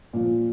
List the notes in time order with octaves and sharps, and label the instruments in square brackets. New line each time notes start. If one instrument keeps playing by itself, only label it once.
[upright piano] A#2 F3